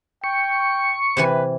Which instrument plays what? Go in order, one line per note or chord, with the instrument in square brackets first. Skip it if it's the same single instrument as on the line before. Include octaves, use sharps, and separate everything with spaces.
[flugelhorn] G5 [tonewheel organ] C#6
[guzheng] C3 E3 G#5 [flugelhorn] B4